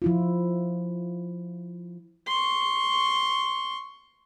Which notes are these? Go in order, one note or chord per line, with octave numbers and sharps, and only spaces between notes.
F3 E4 F4
C6 C#6